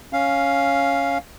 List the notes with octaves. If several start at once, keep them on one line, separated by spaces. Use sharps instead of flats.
C#4 F5